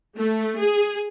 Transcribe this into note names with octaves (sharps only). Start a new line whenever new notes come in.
A3
G#4